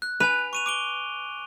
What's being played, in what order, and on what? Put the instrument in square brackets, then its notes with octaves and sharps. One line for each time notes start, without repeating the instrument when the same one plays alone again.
[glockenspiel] F#6
[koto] B4 [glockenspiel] G#5 F7
[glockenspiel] C#6 D#7 F7
D6 D7 G7